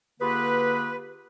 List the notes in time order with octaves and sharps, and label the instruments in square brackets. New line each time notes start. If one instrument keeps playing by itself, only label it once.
[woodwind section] D3 A#3 F4 G4 G#4 B4